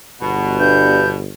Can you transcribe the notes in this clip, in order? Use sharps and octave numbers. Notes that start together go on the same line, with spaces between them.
G1 B2
G2 G6